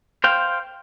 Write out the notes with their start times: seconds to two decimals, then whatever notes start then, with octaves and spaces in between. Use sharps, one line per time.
0.24 C5 F5 G5